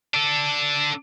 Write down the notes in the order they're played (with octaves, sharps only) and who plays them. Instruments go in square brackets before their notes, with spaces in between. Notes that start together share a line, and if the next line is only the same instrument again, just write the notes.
[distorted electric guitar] D4 A4